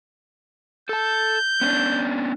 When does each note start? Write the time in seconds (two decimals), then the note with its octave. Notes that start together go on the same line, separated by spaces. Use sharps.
0.89 A4 A5 G6
1.61 B3 C#4 D4